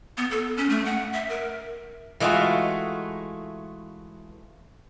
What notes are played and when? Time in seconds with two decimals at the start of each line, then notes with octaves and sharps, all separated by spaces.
0.17 B3
0.31 A4
0.57 C#4
0.70 A3
0.85 F#5
1.13 E5
1.29 A#4
2.20 E3 G#3 A3 F4 F#4